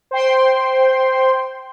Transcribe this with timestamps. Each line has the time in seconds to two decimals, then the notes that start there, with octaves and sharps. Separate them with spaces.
0.11 C5 G5 C6